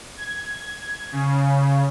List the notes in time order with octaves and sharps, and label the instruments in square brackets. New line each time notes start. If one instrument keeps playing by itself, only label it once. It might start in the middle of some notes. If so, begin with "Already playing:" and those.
[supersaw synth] G#6
C#3